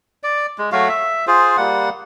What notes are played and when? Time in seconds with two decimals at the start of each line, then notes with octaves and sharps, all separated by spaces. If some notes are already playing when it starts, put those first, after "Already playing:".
0.23 D5
0.58 G#3
0.72 F#3 A3 F#4 F5
0.89 E5
1.27 F4 G#4 C5
1.57 G3 A#3 F#5